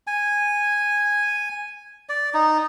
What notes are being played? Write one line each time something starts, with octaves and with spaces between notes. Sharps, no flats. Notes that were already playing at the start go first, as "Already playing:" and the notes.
G#5
D5
D#4